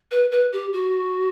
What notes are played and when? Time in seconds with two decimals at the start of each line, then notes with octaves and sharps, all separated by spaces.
0.11 B4
0.31 B4
0.52 G4
0.73 F#4